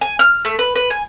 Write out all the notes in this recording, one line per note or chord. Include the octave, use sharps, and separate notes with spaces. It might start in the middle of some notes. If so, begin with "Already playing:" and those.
G#5
F6
A3
B4
B4
G#5